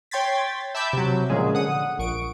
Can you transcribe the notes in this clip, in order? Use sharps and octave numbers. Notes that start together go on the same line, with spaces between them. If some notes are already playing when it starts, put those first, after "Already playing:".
C#5 G5 C6 G#6 A6 B6
E5 A5 B5 D6 E6 G6
C3 F#3
A#2 C#3 F3 F#3 G#3 G#4
D3 F#5 D#6
A#1 C#6 D7